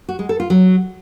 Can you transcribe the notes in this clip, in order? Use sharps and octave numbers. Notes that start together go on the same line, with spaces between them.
F#4
G#3
A4
F4
F#3